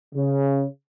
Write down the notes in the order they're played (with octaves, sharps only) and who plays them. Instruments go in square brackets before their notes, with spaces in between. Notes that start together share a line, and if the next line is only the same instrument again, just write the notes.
[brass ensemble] C#3